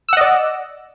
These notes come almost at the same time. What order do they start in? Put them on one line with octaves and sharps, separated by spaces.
E6 F#5 D#5 D5